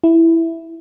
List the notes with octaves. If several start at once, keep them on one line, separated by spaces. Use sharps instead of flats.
E4